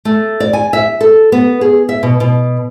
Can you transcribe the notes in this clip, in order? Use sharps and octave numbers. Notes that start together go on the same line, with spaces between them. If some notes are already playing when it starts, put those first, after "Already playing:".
A3
D5
G#5
E5
A4
B3
G#4
E5
B2
B2